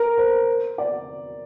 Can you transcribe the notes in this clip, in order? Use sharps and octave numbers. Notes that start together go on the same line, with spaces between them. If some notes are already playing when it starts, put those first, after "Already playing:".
Already playing: A#4
C5
D5